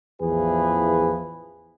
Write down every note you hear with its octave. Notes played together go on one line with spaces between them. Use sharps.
A1 E2 E3 F3 G#4 B4